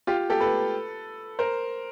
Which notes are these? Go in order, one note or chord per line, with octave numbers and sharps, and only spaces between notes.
F4 G4
G4 A4
A4 B4
A#4 C5